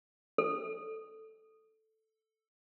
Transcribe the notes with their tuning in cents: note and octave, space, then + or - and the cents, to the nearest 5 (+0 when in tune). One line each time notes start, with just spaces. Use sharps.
A4 +0